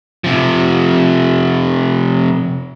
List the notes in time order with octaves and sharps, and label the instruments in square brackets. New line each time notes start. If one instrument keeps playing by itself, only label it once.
[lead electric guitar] C3 F3